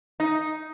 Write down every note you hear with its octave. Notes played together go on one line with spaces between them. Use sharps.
D#4